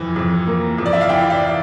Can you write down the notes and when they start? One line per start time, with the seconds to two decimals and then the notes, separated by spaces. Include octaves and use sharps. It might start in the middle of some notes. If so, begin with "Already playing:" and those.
Already playing: F2 E3
0.16 F2
0.47 A#3
0.78 F2
0.86 D5
0.93 E5
1.01 F5
1.09 E3 E5 G5
1.30 D5 F5